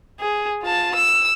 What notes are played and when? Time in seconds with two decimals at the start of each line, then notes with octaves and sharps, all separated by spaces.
0.20 G#4
0.63 F4 A5
0.95 E6